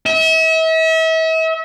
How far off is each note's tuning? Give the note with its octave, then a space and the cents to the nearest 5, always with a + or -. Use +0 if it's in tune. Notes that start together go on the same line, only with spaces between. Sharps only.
E5 -40